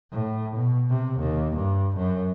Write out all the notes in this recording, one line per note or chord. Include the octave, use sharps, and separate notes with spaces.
A2
B2
C3
D#2
G2
F#2